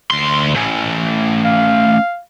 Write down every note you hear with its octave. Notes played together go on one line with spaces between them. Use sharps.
D2 C6
A3 C#4
F5